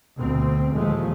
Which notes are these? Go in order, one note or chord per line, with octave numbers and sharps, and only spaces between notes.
D2 B2 C4
D#2 A#2 F3 G#3 A3